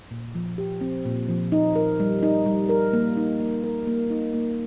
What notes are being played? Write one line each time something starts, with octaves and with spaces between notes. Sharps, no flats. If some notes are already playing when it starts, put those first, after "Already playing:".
A#2
F3
G4
C4
A#2
F3
D#4
A#4
G3
D#4
G3
A#4
A#3
D#4
A#3
A#4
A#3
D#4
A#3